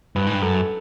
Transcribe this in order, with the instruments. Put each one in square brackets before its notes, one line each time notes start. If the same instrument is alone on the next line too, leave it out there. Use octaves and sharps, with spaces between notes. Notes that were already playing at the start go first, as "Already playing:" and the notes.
[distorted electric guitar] G2 [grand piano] B4
[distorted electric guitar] G#2
G2
[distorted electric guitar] F#2 [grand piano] A4